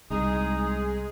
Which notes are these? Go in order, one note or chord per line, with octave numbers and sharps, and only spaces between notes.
C2 G#3 D#4 G#4